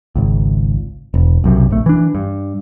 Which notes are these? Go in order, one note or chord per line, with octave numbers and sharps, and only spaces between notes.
G#1 C#2
E1
B1 F#2 C3
A#1 A3
E3 D4
G2